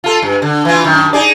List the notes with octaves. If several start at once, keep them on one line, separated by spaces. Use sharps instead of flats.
F4 A4
G2
D3
E3 F4
F#2 D#3
D#4 G#4 D5